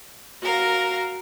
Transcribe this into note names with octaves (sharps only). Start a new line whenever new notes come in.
F#4 A#4 F5